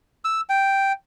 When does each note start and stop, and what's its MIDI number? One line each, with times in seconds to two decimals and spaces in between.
0.25 0.41 88
0.49 0.92 79